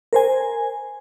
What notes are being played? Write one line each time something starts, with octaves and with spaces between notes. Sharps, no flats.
A#4 C5 G#5